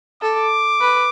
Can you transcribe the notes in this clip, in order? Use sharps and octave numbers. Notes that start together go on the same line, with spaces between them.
A4 D6
B4